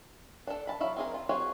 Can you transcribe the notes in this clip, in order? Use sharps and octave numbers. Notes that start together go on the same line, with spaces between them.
D4 A4
A5 B5
F#3 E4 F5
C4 G#4 A#4
F4
C4 C#4 F4 F#4 G#4